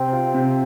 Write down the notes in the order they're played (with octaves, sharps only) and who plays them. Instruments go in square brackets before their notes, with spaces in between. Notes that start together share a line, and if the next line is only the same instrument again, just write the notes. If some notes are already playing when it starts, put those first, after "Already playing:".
Already playing: [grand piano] C3 [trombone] C4
[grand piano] F4
C3